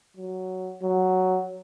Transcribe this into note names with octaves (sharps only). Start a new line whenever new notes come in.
F#3
F#3